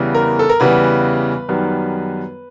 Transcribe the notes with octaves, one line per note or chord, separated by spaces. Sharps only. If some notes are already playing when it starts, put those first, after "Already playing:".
Already playing: E2 C#3 E3 G3 B3
A#4
A4
A#4
E2 C#3 E3 G3 B3 B4
F#2 D#3 G3 B3